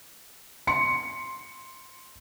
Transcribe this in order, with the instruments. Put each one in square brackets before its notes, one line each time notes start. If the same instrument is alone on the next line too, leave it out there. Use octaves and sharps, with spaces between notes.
[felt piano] C6 C#7